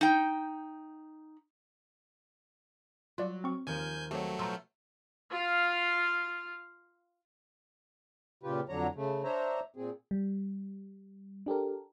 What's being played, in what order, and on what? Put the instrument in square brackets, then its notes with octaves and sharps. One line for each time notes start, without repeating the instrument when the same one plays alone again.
[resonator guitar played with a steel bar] D#4 G5
[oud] F#3 [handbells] F4 D5
[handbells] C4 C#6
[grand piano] D#2 A#4 D#7 [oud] F3 [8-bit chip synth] G#5 G6
[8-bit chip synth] F#3 A3 [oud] C4 D#4 [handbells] G4 C#5
[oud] B2 F3 [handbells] A#5 C6 E6
[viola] F4 F5
[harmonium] A#2 C#3 F4 G4 B4
F2 D3 F#3 D4 C#5 A#5
C#3 A3
D4 C5 C#5 E5 A#5
A#2 C4 G#4
[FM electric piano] G3
D4 G4 A4 A#4